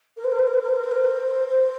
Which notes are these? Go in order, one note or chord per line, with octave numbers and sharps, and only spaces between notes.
A#4
C5
A#4
C5
A#4
C5
A#4
C5
A#4
C5
A#4
C5
C5